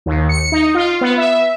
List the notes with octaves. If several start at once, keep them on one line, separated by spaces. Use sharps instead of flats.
D#2
C#7
D#4
F4
B3
E5